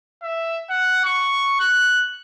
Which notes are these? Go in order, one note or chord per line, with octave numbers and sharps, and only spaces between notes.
E5
F#5
C#6
F#6